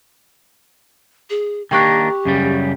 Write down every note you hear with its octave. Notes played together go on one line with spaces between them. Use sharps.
G#4
D#3 A#3 D4 G4 G5 C#6 F#6
F#2 C#3 G3